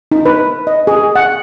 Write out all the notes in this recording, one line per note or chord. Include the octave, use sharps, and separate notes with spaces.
D#4
B4
D#5
G#4
F#5